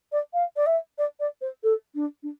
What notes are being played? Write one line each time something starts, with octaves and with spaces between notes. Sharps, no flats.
D5
F5
D5
E5
D5
D5
C5
A4
D4
D4